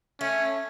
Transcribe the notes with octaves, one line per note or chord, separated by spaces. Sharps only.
A3 C#4